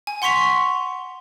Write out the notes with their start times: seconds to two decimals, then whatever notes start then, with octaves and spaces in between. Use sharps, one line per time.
0.07 G#5
0.22 F#5 C6 C#6 B6 F7